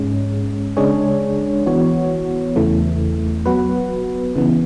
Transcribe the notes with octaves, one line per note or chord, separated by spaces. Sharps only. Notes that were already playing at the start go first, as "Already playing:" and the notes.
Already playing: G#2 G#3 C#4
C#3 G#3 D4 G#4 C#5
E3 B3 F#4 C#5
E2 C#3 E3 A3
F#3 B3 F#4 B4
C#3 E3 B3